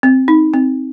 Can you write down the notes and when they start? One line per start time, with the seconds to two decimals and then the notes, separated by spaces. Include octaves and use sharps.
0.03 C4
0.28 D#4
0.54 C4